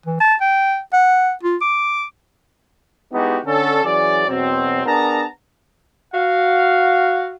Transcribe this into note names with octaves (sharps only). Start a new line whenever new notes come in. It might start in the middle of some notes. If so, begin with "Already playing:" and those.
E3
A5
G5
F#5
F4
D6
G#3 B3 D#4 E4 F#4 G4
D3 C#4 A4
E3 F#3 C#4 G#4 D5
E2 B2 F#3 C4
B3 D4 G#4 A#4 A5 A#5
F#4 F5